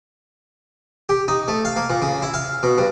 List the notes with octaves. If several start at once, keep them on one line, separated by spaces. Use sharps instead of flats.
G4
D#4
A3
F5
A#3
A#2
C#3
E4
F5
B2
G2